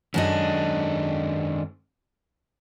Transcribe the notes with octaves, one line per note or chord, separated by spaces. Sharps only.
F#2 D#3 G#3 D4 A4 D#5